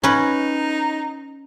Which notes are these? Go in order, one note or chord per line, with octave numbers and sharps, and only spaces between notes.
C#4 D#4 B4